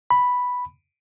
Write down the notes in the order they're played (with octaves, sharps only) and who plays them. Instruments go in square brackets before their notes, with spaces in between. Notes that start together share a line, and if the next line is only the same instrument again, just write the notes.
[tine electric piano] B5